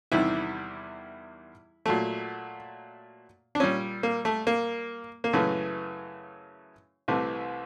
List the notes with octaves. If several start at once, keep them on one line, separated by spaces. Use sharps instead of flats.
E2 C3 D#3 G3 E4
A#2 F#3 A3
D4
A#2 G3 C#4
A#3
A3
A#3
A#3
F#2 C#3 E3 A3
C2 C3 E3 A3